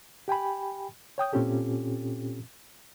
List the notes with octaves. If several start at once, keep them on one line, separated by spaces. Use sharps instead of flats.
G4 G5 G#5 B5
C#5 G5 D#6 G6
A#2 C4 C#4 F4 G4 A4